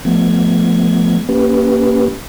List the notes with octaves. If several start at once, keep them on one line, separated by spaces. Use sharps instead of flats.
F3 A3 B3 G#6
A#3 C#4 G4 B4